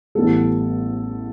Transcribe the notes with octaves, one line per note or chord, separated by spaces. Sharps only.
A1 A2 G3 B3 A4